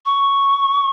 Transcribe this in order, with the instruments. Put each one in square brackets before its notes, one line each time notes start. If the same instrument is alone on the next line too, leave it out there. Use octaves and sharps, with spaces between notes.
[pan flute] C#6